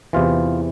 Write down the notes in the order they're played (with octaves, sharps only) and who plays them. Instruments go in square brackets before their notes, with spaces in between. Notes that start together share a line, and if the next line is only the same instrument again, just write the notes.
[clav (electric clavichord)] E2 C3 E3 F4